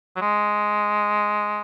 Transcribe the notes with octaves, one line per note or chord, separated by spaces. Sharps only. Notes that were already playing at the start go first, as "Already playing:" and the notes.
F#3
G#3